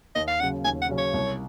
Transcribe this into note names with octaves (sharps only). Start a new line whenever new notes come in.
D#2 D#5
F5
C#3 F#3 C#4 F#5
D#2 G#5
F#5
C#3 F#3 C#4
C#5
C2